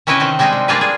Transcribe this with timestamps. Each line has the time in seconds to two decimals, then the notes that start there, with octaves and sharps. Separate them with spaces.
0.07 C3 C#4 E4 B4 C#5 D#5
0.20 D#3 C4
0.39 G3 G#3 C4 D4 D#4
0.53 C3
0.68 G3 A#3 D4 F4 G#4 B4
0.81 G#4